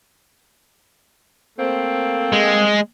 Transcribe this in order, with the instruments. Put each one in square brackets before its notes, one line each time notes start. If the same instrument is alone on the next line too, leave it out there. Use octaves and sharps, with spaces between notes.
[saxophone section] A3 A#3 C4
[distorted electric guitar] G#3